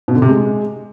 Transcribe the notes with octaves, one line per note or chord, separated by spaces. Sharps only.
B2
D3
C3
G#3